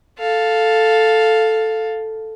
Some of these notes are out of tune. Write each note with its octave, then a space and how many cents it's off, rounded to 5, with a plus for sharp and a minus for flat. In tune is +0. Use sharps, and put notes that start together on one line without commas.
A4 +0 F5 +5